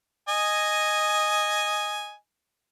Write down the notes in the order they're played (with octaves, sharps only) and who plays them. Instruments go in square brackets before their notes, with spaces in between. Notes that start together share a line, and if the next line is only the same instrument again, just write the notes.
[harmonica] D#5 G#5